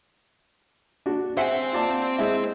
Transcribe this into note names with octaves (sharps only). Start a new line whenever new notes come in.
D4 F#4
C4 C5 E5 F#5 G#5
F4 D5 A5
G#3 E4